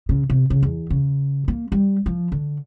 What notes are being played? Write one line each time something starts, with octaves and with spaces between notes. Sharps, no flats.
C#3
C3
C#3
E2
C#3
A#3
G3
F3
D3